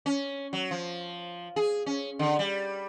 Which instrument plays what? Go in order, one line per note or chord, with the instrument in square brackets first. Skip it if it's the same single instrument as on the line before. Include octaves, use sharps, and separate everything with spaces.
[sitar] C#4
F#3
F3
G#4
C#4
D3
G3